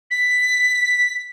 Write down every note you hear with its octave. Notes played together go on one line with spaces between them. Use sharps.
B6